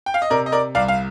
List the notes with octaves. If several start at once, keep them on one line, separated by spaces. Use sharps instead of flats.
G5
F5
D#5
C3 A#4 D5
D#5
A#4 D5
C2 D5 F5
F5